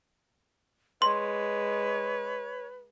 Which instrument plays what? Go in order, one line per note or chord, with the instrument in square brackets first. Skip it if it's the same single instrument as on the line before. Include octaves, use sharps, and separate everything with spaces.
[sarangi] G#3 [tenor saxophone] B4 [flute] C#5 [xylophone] C6